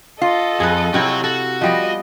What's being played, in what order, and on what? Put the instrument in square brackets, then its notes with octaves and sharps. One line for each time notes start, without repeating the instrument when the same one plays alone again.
[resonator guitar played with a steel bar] F4 [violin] A4 D#5
[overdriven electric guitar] F2 [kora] G#4 B4
[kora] C3 C4 E4 [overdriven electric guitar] F#4 C#5
[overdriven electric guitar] F#4 [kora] A4
[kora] F3 G3 B3 [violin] D#5